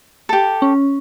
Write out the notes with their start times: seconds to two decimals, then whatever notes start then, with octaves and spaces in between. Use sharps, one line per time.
0.29 G4 A4
0.62 C#4